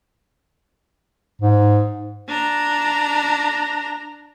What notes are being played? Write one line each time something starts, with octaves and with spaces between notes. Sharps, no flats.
G#2
D4 A#5